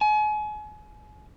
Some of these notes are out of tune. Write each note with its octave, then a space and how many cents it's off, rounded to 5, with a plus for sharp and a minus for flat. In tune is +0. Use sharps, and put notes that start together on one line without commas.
G#5 +35